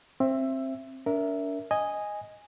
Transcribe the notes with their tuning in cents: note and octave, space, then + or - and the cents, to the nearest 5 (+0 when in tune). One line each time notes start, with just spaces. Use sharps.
C4 +20 E5 +20
D4 -40 A#4 +0 E5 +0
D#5 +0 G#5 -5